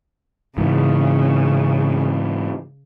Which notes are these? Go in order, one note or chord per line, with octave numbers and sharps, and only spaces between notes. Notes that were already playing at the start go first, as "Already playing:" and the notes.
G#2 C#3 E3